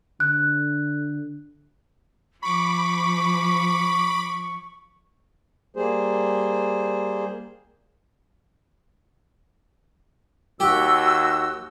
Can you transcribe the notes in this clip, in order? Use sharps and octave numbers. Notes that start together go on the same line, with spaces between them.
D3 F#6
F3 B5 C#6 D6
G3 A#3 G#4 C5
D#2 F#4 G4 E6